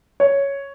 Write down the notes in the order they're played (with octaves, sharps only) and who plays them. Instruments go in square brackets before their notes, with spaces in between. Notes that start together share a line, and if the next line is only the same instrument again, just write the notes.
[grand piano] C#5